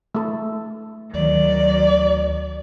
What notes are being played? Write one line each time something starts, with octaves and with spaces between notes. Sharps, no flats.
A3 A4
D2 D#3 F#3 D5